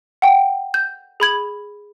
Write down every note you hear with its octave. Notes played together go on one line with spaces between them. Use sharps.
F#5 G5
G6
G#4 B5 G#6 F#7